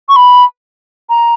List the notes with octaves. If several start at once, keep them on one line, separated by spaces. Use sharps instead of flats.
C#6
B5
A#5